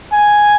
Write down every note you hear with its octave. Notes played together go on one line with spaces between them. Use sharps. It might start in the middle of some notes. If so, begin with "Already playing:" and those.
G#5